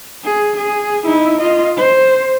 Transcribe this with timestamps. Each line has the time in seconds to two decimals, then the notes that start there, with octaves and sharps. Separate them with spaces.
0.24 G#4
0.56 G#4
1.05 D#4 E4
1.40 F4 D#5
1.77 C5